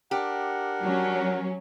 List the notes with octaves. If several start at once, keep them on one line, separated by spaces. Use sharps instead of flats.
D4 G4 A#4 F#5
F#3 C#4